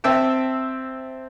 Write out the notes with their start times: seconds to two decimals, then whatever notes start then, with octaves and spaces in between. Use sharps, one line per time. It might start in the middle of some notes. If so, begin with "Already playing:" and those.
0.04 C4 E5 G5 A5